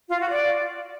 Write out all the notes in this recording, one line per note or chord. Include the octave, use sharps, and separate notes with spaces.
F4
F#4
D5